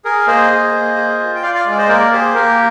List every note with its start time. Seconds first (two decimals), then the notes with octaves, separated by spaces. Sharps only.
0.05 G#4 A#4
0.27 A#3 C5 D#5
0.51 G#4
0.74 A#3
0.96 G#4
1.19 F4
1.35 G5
1.43 F4 D5 F5
1.55 D5 F5
1.66 G#3
1.71 D5
1.78 C5 D#5
1.88 A#3 A#4 D5
2.12 G4 G#4 C5
2.35 A#3 A#4